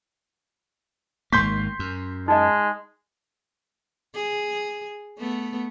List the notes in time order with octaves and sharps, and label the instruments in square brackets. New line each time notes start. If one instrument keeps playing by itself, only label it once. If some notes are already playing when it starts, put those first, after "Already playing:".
[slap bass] G#1 G#2 A#3 [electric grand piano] C6 G6 B6 [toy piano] C#6
[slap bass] F#2
[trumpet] G#3 [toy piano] D#4 D#5
[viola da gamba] G#4
A3 B3